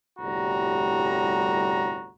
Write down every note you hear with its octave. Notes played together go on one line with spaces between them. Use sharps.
G1 C2 A2 G3 F#4 A#5